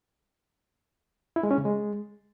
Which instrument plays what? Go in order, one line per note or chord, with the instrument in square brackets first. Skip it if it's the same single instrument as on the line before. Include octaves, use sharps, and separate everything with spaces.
[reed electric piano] E4
G#3
C#4
C#3
G#3